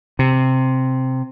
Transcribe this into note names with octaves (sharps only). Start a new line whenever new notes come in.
C3